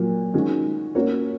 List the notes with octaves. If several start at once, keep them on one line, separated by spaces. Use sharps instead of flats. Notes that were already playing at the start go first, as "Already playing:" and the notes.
Already playing: A#2 F#3 A#3
D#3 G#3 C#4 F#4
A#3 C#4 F#4 A#4 C#5